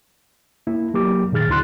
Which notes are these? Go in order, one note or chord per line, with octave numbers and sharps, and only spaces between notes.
A#3 E4
F#3 A#3 G4 D6
A#2 D#3 G#4 F6 A6
D2 D3 E4 C6 F#6